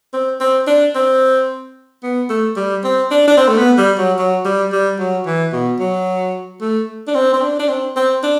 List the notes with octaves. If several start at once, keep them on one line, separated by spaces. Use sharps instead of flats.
C4
C4
D4
C4
B3
A3
G3
C4
D4
D4
C4
A3
B3
G3
F#3
F#3
G3
G3
F#3
E3
B2
F#3
A3
D4
C4
C4
D4
D4
C4
C4
D4